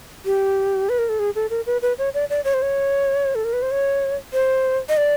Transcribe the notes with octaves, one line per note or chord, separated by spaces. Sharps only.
G4
B4
A#4
A4
G#4
A4
A#4
B4
B4
C#5
D5
D5
C#5
C5
C#5
A4
A#4
B4
C5
C#5
C5
D#5
D5